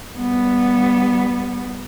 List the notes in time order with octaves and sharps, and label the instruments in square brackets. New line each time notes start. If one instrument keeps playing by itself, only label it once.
[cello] G3 B3